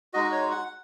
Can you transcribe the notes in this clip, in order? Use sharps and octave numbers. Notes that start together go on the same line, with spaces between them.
G#3 D#4 F#4 D#5
C#5
F#5